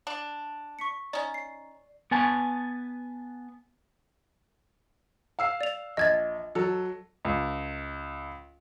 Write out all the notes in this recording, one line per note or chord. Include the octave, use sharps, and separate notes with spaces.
D4
C#6 B6 C#7
C#4 D#4 D5
C7
B3 B4 G#5 A5
F5 E6 C7
D5 F7
A#1 D#5 G#6 A6
F#3 A4
C#2